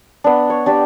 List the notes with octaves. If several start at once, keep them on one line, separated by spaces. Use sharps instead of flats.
B3 D4
C#5
D4 G4 D5